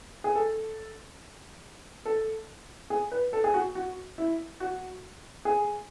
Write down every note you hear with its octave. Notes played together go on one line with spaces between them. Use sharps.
G#4
A4
A4
G#4
B4
A4
G#4
F#4
F#4
E4
F#4
G#4